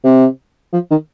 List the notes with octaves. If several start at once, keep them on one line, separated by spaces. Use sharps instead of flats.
C3
F3
D#3